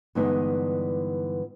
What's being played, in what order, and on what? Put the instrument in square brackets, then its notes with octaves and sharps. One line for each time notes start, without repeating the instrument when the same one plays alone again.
[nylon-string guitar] G2 D3 E3 G#3 B3 D#4